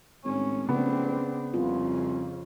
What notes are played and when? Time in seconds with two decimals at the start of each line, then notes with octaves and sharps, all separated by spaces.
0.24 G#1 A2 C#4
0.69 F1 C#3 B3 C4 D4
1.54 C2 F2 C#3 F4